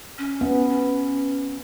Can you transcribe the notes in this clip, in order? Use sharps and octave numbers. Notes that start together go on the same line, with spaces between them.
C#4
B3
C#4